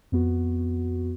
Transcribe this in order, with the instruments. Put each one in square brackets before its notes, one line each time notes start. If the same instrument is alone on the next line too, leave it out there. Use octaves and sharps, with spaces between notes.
[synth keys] F2 B3 F#4